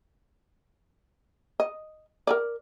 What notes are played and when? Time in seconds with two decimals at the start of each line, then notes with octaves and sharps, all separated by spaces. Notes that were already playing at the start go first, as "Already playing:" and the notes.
1.60 D#5
2.27 A#4 B4 D5